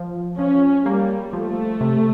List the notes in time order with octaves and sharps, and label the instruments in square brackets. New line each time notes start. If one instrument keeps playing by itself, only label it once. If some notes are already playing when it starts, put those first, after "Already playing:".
Already playing: [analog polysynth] F3
[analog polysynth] F3 [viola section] C#4
[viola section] G3 [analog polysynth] A#3
[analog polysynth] F3 [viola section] A3
[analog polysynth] C3